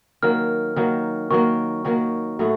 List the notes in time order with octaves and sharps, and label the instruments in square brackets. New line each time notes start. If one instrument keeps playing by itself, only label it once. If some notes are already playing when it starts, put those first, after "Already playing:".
[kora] D#3 F#3 A#3 [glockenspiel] F6
[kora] D#3 F#3 A#3
[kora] D#3 F#3 A#3 [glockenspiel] C#6
[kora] D#3 F#3 A#3
A2 F#3 A3